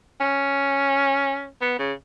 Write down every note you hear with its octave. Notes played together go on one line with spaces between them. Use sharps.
C#4
B3
C#3